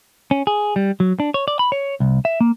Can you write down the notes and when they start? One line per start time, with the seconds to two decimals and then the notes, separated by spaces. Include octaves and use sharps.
0.31 C#4
0.47 G#4
0.76 G3
1.00 F#3
1.20 D4
1.34 C#5
1.48 D5
1.59 B5
1.72 C#5
2.00 C2
2.25 E5
2.41 A#3